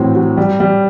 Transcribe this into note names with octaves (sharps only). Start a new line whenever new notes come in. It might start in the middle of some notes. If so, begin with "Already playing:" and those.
Already playing: A2 E3 F#3 C4
F#3
G3
G3